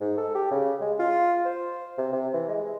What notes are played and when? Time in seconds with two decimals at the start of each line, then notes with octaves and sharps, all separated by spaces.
0.01 G#2
0.17 A4
0.35 G4
0.51 C#3
0.81 G#3
0.99 F4
1.45 C5
1.98 C3
2.13 C3
2.34 E3
2.48 G#3